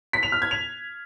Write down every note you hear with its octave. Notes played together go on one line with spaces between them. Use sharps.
B6
F7
F6
G#6
F7